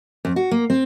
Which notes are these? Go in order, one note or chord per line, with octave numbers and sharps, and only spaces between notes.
F2
F#4
A#3
C4